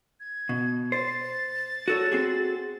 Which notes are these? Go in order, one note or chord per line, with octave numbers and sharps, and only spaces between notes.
G#6
B2
C5 A6
F#4 A4 C#5
C4 F#4 G#4